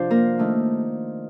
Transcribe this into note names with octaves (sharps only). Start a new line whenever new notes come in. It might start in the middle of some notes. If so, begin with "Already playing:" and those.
Already playing: C3 F3 D4 F4 C5 D5 F5
A#3 A#4
D#3 A3 D4